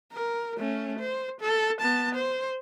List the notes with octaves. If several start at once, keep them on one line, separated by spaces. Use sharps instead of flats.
A#4
A3 C#4
C5
A4
B3 A5
C5